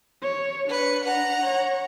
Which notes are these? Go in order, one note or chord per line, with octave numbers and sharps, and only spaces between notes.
C#5
D4 B4 C#7
F#5 A#5
C#5